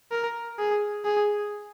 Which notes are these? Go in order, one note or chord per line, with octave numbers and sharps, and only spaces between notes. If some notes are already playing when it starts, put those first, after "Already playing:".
A#4
G#4
G#4